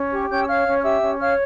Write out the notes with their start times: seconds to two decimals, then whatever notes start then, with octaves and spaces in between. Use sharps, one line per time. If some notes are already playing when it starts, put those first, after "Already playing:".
Already playing: C#4
0.12 G4 C#5 C#6
0.29 C#4 G5 G6
0.41 E6
0.47 C#5 F5 F6
0.67 C#4
0.79 F6
0.84 G4 E5 E6
1.02 C#4
1.20 C#5 F5 F6